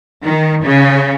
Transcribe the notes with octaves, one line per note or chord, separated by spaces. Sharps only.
D#3
C#3